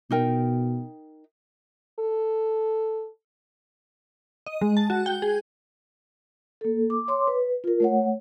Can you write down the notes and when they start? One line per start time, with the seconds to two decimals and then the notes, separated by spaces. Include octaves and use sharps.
0.11 B2 D#4 A#4 G5
2.00 A4
4.46 D#5
4.61 G#3
4.77 A5
4.90 F#4
5.06 G5
5.22 G#4
6.61 A#3 A4
6.90 D6
7.08 C#5 C6 D6
7.27 B4
7.64 F4 A#4
7.80 A3 C#5 F#5